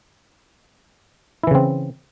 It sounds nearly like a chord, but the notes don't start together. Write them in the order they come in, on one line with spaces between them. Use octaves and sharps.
E4 E3 C#3 C4